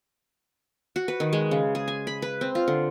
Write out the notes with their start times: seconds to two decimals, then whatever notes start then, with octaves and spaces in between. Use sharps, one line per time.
0.96 F#4
1.08 B4
1.20 D#3
1.33 G#3
1.51 C#3
1.75 G#4
1.88 G#5
2.07 B5
2.22 B4
2.41 C4
2.55 F4
2.68 D3